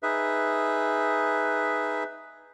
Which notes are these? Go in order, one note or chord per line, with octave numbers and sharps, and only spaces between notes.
D#4 G#4 B4 E5